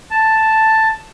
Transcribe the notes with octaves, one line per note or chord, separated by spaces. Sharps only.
A5